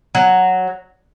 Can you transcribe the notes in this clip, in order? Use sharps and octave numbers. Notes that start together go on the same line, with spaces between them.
F#3